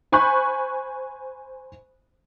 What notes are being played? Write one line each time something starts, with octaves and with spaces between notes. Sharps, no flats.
C5 G#5 B5 C#6 F#6 G6